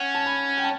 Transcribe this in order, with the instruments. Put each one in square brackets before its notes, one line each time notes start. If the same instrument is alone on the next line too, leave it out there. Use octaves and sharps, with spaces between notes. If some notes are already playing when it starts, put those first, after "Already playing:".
Already playing: [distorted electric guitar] C#4 [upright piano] F#5
[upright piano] A5
B5
G5
A5